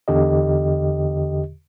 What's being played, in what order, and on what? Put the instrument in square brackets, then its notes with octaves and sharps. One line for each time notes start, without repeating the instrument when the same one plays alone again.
[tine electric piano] E2 D3 G4 D#5